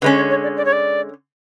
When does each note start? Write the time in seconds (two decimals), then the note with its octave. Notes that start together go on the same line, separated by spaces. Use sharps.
0.02 D3 G#3 C#4 B4
0.16 C#5
0.30 C#5
0.43 D5
0.57 D5
0.65 C#5
0.73 D5